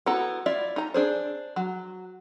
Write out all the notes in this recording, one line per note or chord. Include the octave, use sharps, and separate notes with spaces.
B3 E4 F#4 A4 A#5
E4 F4 D5 E5
D#4 A#5
D4 G#4 C5
F#3